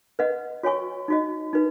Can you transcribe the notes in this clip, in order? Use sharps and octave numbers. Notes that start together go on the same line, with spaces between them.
B4 D#5 F#5
F#4 C#5 G#5 C#6
D#4 F#4 D#5
D#4 F#4 B4